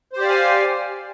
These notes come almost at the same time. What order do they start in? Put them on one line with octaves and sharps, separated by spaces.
C5 G4 D5 F5 G#5